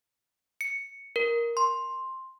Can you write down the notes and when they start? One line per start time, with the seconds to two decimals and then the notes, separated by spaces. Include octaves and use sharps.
0.61 C#7
1.16 A#4
1.57 C6